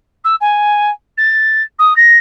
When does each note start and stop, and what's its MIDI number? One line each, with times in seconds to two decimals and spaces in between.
0.24 0.35 88
0.41 0.90 80
1.17 1.63 93
1.79 1.96 87
1.96 2.18 94